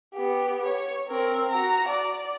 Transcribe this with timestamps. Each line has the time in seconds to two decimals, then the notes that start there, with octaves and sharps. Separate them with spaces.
0.14 B3 G4
0.66 C#5
1.09 C4 A#4
1.49 F#4 A#5
1.89 D5